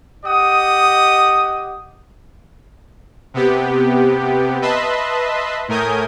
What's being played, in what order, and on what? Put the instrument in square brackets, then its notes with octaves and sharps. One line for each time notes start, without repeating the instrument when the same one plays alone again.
[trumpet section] G4 D#5 F#5 D#6
[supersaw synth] C3 B3 G4
B4 D#5 E5 A5 B5 C6
A2 A3 A#4 G#5 D#6 G6